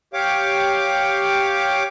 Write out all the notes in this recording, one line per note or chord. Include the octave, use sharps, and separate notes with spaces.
G4 C#5 F5 D6